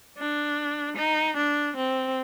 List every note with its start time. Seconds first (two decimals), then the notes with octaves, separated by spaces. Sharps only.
0.18 D4
0.97 D#4
1.37 D4
1.77 C4